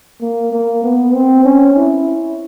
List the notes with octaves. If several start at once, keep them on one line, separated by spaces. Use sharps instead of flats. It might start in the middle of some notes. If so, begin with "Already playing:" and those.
A#3
A#3
B3
C4
C#4
E4